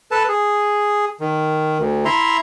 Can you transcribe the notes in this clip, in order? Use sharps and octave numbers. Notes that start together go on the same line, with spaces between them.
A4 B4 A5
G#4
D#3
D2
E4 E5 A#5 C6